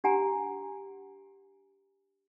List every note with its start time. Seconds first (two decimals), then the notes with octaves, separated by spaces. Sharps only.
0.04 D4 G4 F#5 G#5 A#5